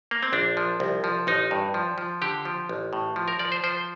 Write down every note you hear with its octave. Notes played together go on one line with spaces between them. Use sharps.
A#3
C4
A#1 D4
F3
C2
F3
A1 D#4
G2
F3
F3
D3 G4
F3
A1
A2
F3
A#4
F3 D5
C5
F3 C5